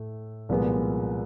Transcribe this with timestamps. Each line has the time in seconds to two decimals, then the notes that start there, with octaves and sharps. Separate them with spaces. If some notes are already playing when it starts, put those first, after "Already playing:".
Already playing: A2 A3
0.49 C2 A#2 F3 G#3 B3